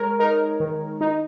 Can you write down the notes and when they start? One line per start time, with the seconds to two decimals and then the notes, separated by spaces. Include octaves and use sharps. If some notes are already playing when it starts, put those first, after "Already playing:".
Already playing: G#3 A#4 C#5
0.19 D#4 A#4
0.60 D#3
1.01 D#4